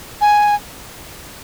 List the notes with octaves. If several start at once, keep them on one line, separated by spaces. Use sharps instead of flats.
G#5